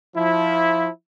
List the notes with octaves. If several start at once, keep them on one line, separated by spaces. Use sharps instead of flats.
F3 E4